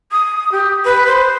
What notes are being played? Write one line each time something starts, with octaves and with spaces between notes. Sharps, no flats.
D#6
G4
B4
C5